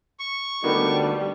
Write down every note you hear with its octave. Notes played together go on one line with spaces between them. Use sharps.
C#6
D2 D3 G3 A#3 B3 D4 D#4